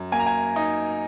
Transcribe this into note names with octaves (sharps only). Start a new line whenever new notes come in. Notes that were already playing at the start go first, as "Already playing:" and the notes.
Already playing: F#2
A#3 G#5
A#5
G#5
D#4